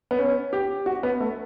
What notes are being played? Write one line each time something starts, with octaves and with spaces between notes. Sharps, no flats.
B3
C#4
G4
F#4
B3
A3